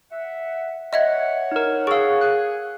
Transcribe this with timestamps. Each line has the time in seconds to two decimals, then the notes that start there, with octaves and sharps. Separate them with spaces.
0.11 E5 F#5
0.93 C#5 D#5 E5 F#5 G#6
1.52 D#4 A#4
1.87 G#4 F5 C#6 E6
2.21 G#4 F#6